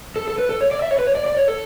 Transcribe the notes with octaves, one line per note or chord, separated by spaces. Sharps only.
A4
A4
B4
A4
C#5
D5
E5
C#5
B4
C#5
D5
D5
C#5
A4